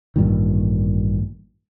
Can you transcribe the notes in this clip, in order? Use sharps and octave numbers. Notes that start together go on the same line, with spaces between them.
A1 G2 A#2 D#3